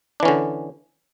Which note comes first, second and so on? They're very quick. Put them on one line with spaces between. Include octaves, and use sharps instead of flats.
D4 E3 C#4 D3